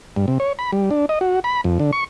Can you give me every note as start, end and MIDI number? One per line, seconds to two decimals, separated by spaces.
0.16 0.26 43
0.28 0.38 48
0.40 0.53 73
0.59 0.71 83
0.73 0.90 55
0.91 1.06 62
1.09 1.19 75
1.21 1.40 66
1.44 1.61 83
1.64 1.79 41
1.79 1.91 50
1.93 2.04 85